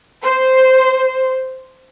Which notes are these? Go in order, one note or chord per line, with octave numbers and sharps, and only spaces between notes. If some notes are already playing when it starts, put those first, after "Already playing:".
C5